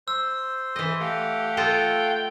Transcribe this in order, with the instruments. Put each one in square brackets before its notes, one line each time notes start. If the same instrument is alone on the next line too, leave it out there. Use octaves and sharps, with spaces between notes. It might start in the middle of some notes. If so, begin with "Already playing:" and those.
[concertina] C5 [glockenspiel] E6
[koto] E3 D#5
[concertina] A3 F5 F#5 [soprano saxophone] G4
[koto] F4 A4 D#5 [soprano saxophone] G5